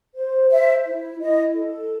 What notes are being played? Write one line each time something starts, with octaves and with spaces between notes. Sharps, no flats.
C5
C5 E5
E4
E4 D#5
A4